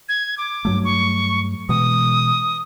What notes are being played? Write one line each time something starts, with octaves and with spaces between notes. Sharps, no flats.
G#6
D6
G2 F#3 A3
C#6
B2 E3 G#3 D#6